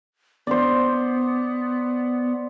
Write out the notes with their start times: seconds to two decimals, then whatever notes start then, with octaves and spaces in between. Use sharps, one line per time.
0.47 B3 C5 D5